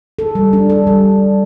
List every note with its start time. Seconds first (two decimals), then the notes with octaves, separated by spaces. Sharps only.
0.19 A4
0.35 G3
0.53 D4
0.70 A4
0.87 G3